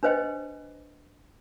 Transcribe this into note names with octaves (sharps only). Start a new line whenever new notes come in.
D4 B4 C5 D#5 G5